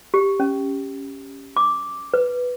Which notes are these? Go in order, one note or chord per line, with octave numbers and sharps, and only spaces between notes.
G4
C#4
D6
B4